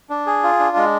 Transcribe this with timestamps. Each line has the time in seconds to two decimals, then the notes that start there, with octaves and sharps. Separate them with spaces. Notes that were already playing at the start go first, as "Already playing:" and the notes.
0.10 D4
0.26 G#4
0.43 F4
0.59 D4
0.76 G#3